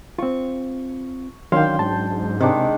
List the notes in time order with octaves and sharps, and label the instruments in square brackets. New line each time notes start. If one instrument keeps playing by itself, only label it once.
[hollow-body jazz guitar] C4 F4 [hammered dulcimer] C#6
[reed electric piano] D#3 F5 [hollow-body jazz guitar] F#3 C#4 D4 [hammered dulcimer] G5 C6
[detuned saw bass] G#2 [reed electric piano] A5
[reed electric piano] C3 [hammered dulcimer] D#3 G#3 D4